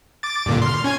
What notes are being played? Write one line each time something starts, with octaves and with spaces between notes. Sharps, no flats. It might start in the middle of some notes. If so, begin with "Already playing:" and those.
D6 A6
G2 A#2 D3
C6 F6
C#4 G#5 G#6